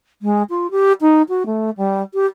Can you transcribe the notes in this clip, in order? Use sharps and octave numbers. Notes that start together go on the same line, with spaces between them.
G#3
F4
G4
D#4
F#4
A3
G3
G4